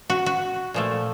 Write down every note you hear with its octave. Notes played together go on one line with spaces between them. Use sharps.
F#4
F#4
A#2 F3 A3